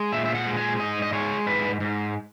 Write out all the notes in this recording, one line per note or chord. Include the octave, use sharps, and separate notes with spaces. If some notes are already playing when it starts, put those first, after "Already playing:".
Already playing: G#3
A#2 E5
E5
F#5
G#3
G#5
G#2 D#5
D#5
G#3 C#5
G#2 B4
G#2